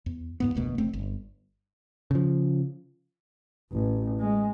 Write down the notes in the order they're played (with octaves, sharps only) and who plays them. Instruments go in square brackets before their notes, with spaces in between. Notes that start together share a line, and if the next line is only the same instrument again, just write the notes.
[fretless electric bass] E2
D#2 G#2 B3
F1 D2 B2 A#3
E1 A3 C4
G1
[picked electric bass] C#3 F3
[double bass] A1
G#3